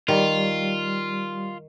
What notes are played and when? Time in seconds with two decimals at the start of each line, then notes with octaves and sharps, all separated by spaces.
0.08 D#3 G3 F4